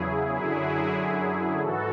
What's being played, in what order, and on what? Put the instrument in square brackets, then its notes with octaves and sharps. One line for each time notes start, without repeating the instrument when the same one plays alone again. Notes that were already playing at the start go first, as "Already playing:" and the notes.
Already playing: [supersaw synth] E2 C#3 F#3 E4 G#4
F#2 D3 F#3 E4 G#4
G#2 E3 F#4 A4